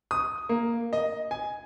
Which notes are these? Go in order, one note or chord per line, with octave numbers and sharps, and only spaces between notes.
D#6
A#3
D#5
G#5